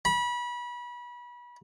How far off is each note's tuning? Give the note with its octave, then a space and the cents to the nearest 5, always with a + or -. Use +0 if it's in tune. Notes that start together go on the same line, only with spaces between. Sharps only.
B5 -30